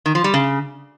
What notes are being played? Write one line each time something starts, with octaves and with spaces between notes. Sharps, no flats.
D#3
F3
G3
C#3